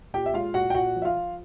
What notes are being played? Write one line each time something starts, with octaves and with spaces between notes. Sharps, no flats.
A#2 G4 G5
E5
G#3 F4 F5
A#2 F#4 F#5
G5
A#2 F#4 F#5
F3
E5
F4 F5
F3